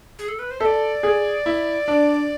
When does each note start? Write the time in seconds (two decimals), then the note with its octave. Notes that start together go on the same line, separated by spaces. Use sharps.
0.19 G#4
0.28 A4
0.39 B4
0.51 C5
0.60 A4 E5
0.65 D5
1.03 G#4
1.46 E4
1.88 D4